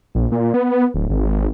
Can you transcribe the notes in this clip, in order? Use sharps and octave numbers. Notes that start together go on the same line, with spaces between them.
A#1
A#2
B3
D1
G#1